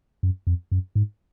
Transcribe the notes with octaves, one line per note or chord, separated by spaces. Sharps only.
F#2
F2
F#2
G#2